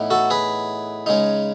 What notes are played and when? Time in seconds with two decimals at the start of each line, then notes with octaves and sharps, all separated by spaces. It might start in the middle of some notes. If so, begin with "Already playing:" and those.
Already playing: A2 E3 B3 D#4
0.10 F#4 A4
0.30 G#4 B4
1.06 C#3 G#3 D#4